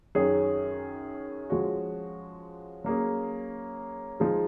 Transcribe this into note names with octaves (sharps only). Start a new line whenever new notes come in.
F#2 D#3 F#3 C#4 G#4
F3 G#3 C#4 F#4
F#3 A#3 C#4 G#4
F3 G#3 D#4 G#4